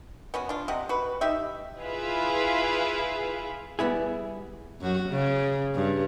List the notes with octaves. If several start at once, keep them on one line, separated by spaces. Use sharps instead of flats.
B3 C#4 F#4
D4 F4
C3 D#5 F#5
F#4 B4
D#4 G4 E5
E4 F4 G#4 B4 E5 F5
G3 B3 E4 G#4
F#2 F#4
C#3
G2